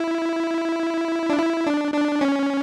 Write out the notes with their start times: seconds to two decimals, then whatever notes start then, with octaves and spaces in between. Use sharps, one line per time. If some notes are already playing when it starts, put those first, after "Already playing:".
Already playing: E4
1.29 D4
1.39 E4
1.66 D4
1.94 D4
2.21 C#4